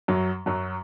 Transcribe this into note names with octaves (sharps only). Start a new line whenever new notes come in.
F#2 F#3
F#2 F#3